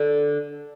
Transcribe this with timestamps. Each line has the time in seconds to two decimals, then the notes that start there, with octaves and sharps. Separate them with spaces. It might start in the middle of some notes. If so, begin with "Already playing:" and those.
Already playing: D3